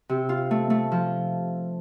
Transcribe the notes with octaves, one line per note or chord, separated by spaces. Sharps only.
C3
F4
A3
A3
F3